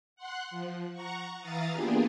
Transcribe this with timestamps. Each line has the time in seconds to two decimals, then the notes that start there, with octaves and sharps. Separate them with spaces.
0.16 F#5 C6 F#6
0.51 F3
0.93 F#5 A#5 C#6
1.40 E3 E4 F5 A#5 D#6 A6
1.72 A#3 B3 D4 F4 G4 G#4